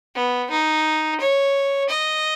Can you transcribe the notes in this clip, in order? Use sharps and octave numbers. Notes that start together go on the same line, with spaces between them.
B3
D#4
C#5
D#5